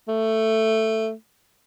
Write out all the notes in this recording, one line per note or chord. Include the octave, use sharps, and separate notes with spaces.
A3